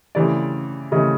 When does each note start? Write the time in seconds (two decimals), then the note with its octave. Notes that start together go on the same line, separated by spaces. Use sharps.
0.15 C#3 E3 A3 C4 D5
0.92 C#3 E3 A3 C4 D#5